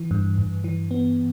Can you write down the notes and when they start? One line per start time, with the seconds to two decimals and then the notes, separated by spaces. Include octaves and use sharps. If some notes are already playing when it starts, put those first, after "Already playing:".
Already playing: E3
0.11 G2
0.38 G2
0.64 E3
0.91 B3